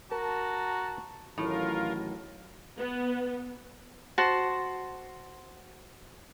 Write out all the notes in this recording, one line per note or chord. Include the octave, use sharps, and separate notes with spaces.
F#4 A#4 A5 A#5
A1 A2 D#3 F#3 F4 A#4
B3
F#4 C5 A5